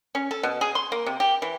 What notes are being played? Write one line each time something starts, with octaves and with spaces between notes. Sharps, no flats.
C#4
A4
B2
G#4
C6
A#3
C3
G4
E3